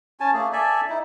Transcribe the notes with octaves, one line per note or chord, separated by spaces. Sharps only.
C#4 G#5 A5
A3 A#3 G#4
A4 D5 E5 G#5
D#4 E4